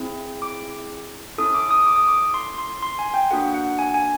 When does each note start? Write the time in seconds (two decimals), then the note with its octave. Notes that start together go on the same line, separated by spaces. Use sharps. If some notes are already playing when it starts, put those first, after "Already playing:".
Already playing: C4 E4 G#4
0.42 D6
1.38 C#4 E4 A4 D#6
1.54 D6
1.71 D#6
1.86 D6
1.96 D#6
2.08 D6
2.34 C6
2.58 C6
2.82 C6
2.99 G#5
3.14 G5
3.31 A#3 D4 F#4 A4 F#5
3.55 F#5
3.79 G#5
3.94 G#5